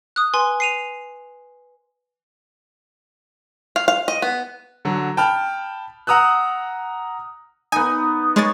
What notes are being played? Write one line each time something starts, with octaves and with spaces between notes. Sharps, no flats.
D#6 F#6
B4 G#5 C6
C7 D#7 F7
F5
F5
D#5
B3
D3 F#3
G5 A5 B5 F6
F#5 A#5 D#6 E6 F#6
B3 D#4 G#5
G#3 C#5 A6